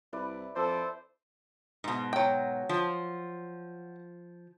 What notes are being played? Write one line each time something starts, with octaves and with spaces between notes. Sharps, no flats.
C2 E4 B4 D5
F2 A4 C5 D5
G#2 B2
F#3 G5
F3